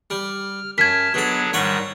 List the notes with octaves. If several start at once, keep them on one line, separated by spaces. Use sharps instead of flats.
G3 F6
F#2 A5 F6 G#6 B6
B2 F#3 D4 G#4 A4
G#2 D#3 F#3 G3 F#5 C#6